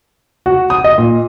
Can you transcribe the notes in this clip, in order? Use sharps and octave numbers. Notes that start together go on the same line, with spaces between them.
F#4
D#6
D#5
A#2